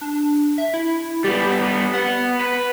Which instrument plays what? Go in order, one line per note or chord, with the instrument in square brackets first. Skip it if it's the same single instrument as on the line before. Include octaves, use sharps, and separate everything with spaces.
[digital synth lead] D4
E5
E4
[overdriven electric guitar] G3 B3 [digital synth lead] G4
[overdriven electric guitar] B3 [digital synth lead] F#5
[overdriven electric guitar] B4